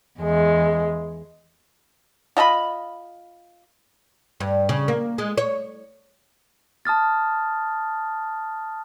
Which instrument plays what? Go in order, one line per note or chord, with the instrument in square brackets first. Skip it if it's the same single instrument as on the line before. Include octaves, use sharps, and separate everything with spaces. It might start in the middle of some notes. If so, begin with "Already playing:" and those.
[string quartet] E2 G#3
[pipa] F4 D#5 A5 B5
[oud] G2
C#3
A#3
G#3
C#5
[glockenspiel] A5 D#6 F6 A6